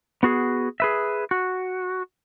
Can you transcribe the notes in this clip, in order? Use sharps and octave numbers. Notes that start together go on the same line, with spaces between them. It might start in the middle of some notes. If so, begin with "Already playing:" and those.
B3 F#4 G#4
G#4 B4 E5
F#4